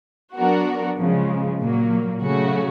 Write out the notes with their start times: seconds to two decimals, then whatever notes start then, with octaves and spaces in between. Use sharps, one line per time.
0.35 F#3 B3 D4 F#4 A#4
0.98 C#3 F3 G#3
1.61 A#2 F#3 A#3
2.24 C#3 F#3 A3 C#4 F#4